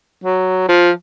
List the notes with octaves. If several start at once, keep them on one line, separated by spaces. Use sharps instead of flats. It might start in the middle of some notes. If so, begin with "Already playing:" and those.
F#3
F3